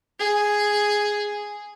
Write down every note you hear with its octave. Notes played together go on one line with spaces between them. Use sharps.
G#4